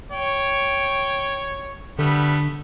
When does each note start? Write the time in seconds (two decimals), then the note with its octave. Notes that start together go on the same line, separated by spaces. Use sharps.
0.12 C#5 G5
1.99 D3 G3 A3 B3